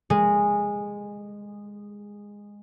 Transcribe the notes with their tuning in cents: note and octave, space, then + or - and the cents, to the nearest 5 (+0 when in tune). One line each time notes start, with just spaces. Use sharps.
G#3 -15